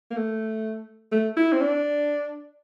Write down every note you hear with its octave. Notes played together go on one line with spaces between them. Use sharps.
A#3
A3
A3
E4
C4
D4